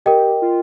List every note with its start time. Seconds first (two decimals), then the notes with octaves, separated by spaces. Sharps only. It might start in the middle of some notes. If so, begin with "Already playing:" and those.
0.06 G4 A#4 D#5 G5
0.42 F4